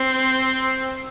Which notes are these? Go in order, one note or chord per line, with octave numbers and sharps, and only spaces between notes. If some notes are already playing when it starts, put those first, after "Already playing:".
Already playing: C4